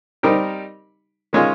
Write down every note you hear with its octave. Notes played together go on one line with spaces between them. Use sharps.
G3 C4 D#4 G4 A#4
D#3 G#3 C#4 F4